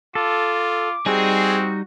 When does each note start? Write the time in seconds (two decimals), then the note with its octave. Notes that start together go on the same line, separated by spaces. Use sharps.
0.15 F4 A4 D6
1.06 G3 C4 D#4 F#4 G#4